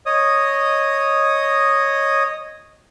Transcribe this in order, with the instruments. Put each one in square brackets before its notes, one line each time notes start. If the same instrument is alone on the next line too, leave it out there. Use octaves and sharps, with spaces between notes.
[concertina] C#5 D#5 D#6